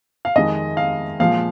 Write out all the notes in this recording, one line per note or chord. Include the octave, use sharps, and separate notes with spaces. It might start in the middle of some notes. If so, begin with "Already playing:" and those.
F5
F2 D#3 G#3 D#5
F5
A#2 F3 G#3 F5